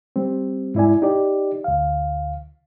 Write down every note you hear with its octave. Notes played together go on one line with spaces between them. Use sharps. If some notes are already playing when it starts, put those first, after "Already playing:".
G3 C4
G#2 E4 D5 G#5
D#4 G4 D5
D2 F5